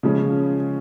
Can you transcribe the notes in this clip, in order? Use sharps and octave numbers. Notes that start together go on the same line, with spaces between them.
C#3 F3 G#3 C#4